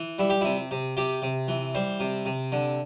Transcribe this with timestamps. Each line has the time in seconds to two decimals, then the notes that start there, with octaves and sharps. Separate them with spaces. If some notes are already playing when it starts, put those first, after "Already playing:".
Already playing: E3
0.19 G3 E4
0.30 G4
0.41 C3 E4
0.71 C3
0.97 C3 G4
1.22 C3
1.48 E3
1.75 G3 C5
2.00 C3
2.25 C3
2.52 D3